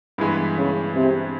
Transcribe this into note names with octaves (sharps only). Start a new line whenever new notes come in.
G2 E3 G#3 B3
C#3
C3